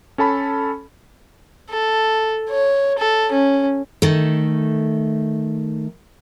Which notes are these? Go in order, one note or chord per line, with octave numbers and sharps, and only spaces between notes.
C#4 A4 A5 B5
A4
C#5
A4
C#4
D#3 A3